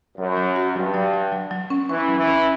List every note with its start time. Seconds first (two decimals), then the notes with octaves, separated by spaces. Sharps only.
0.18 F#2 F#3
0.37 F#3
0.56 F#4
0.75 G2 F#3
0.94 F#3
1.13 F#3
1.32 F#3
1.51 F#3
1.70 C#4
1.89 E3 C#4
2.09 F#3
2.18 E3
2.27 C#4